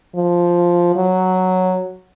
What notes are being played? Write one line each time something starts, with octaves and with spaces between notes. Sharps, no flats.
F3
F#3